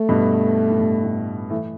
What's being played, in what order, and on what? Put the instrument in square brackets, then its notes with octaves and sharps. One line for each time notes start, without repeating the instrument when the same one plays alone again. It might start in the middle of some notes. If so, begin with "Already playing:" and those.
Already playing: [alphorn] A3
[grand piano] G2 B2
A2
G2
A2
E3 A3